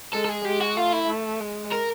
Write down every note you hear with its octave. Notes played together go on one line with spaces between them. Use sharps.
G#3 A4
A4
G#4
G#3 G4
F#4
A3 F4
E4
A3
G#3
A#4